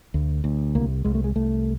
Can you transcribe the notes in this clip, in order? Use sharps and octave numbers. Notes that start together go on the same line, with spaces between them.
D2
D2
C2 A#3
C2 G#3
A3
G#3
C2 A3